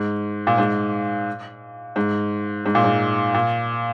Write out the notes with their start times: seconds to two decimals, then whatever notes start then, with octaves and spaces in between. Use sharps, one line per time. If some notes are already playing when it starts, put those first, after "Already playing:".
Already playing: G#2
0.47 A#2
0.58 G#2
1.96 G#2
2.65 G#2
2.75 A#2
2.84 G#2
3.34 A#2